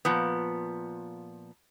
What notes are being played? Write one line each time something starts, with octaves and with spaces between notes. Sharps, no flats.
A#2 F3 B3